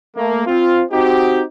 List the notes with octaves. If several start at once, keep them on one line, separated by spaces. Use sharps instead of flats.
A3 A#3
C4 F4
C4 D#4 F#4 G4